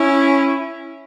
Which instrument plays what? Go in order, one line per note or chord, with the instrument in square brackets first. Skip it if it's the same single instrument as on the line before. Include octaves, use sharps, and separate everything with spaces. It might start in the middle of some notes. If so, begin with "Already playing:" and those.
Already playing: [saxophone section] C#4 E4